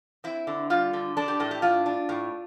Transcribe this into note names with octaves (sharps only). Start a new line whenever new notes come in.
C4 E4
D3
G3 F4
D3
D4 A4
G4
A2 A4
G4
D4 F4
D4
A2